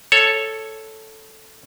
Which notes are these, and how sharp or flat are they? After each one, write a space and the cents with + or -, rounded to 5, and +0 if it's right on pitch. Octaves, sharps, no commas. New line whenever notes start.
A4 +0 C#5 +0